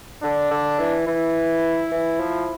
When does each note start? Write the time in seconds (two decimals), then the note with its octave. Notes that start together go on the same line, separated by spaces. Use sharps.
0.23 D3 D4
0.51 D3
0.79 E3
1.07 E3 E4
1.91 E3
2.20 F3